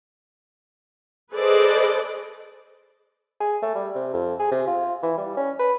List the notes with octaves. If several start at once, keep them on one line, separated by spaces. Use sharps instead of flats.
G#4 A4 B4 C5 D5 D#5
G#4
A3
G3
C3
F2
G#4
C3
F4
E3
G3
C#4
B4